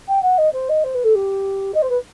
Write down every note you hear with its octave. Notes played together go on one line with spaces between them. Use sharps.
G5
F#5
D#5
C5
D#5
C5
B4
A4
G4
D#5
C5
B4